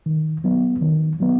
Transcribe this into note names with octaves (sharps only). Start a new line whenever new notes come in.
D#3
F#3 B3
D#3
F#3 B3